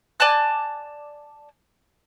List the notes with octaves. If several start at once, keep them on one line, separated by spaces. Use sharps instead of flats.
D5 G#5 A5 F#6